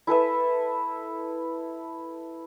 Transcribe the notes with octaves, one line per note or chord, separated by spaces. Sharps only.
E4 A4 B4 E5